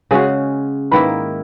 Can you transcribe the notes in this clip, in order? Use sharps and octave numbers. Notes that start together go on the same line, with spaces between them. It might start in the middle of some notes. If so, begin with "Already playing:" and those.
C#3 G#3 C#4 F#4 G#4 G#5
G#2 D#3 A#3 E4 B4 B5